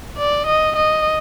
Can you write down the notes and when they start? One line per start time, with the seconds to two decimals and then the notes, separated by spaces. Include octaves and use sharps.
0.18 D5
0.47 D#5
0.76 D#5